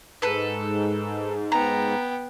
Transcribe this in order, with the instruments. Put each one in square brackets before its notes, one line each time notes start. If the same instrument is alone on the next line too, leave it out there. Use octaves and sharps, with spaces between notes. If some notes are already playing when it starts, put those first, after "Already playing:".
[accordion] G#2 [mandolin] A4 B4
[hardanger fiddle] B3 G5 [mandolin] A#5